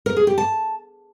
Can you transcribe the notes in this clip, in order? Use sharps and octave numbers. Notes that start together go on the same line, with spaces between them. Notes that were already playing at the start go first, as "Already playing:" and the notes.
A#4
G#4
G4
A5